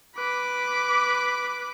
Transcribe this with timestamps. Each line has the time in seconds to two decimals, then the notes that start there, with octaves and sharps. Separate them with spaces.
0.16 B4 D6